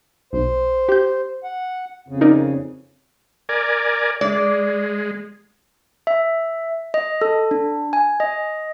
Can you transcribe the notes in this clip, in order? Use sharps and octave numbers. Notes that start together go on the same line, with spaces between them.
B1 C5
G4 G6
F#5
F2 C#3
D#4 A#4 D5
A#4 D5 G#5
G#3 D5
E5
D#5
A4
D4
G#5
D#5